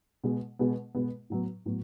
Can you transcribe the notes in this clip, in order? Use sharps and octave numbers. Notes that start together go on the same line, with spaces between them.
B2 G#3 B3
B2 G#3 B3
B2 G#3 B3
A2 F#3 B3
A2 F#3 B3